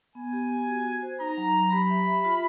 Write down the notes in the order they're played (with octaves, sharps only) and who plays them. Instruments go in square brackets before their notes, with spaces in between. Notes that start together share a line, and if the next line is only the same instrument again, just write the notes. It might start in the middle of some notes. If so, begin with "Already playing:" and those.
[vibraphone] B3 [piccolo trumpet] G#5
[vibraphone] G4
B3
F#4
F#4
C5
[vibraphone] D#4 [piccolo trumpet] A#5
[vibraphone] F#3
F#3
[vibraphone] G4 [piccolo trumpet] B5
[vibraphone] E5
E5
F4